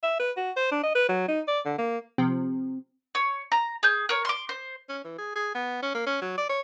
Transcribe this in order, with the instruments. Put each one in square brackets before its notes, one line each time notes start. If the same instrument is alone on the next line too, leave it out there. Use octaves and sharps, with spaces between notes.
[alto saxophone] E5
B4
F#4
C5
D4
D#5
B4
F#3
D#4
D5
D3
A#3
[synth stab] C3 F3 [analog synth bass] C4
[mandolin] C#5
A#5
G#4 G6
A#4 C#5
C6 D6
C5
[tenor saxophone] C#4
E3
G#4
G#4
B3
C#4
A#3
C#4
F#3
D5
C#5